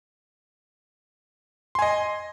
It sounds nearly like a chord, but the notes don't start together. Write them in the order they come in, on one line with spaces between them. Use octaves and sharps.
C6 G#5 D#5